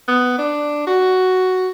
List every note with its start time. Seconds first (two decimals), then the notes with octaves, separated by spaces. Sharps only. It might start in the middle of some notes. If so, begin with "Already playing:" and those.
0.08 B3
0.38 D4
0.87 F#4